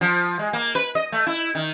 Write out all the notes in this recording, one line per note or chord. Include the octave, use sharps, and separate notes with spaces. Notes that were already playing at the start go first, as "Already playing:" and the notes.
F3
G#3
A#3
B4
D#5
A3
E4
D#3